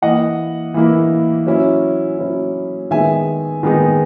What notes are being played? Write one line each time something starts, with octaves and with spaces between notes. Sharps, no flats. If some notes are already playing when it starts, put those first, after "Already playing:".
E3 A#3 E4 D#5 F#5
E3 A#3 E4
F#3 C#4 E4
F#3 C#4 E4
D#3 G#3 B3 D#4 E5 G#5
D#3 G#3 B3 D#4